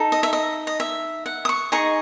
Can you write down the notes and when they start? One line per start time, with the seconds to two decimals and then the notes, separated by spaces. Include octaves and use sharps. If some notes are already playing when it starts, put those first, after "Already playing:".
Already playing: D#4 A4
0.12 D#5
0.23 E5
0.33 D#5
0.67 D#5
0.80 E5
1.26 F#5
1.45 D#6
1.49 C#6
1.72 D#4 G#4 D#5 C#6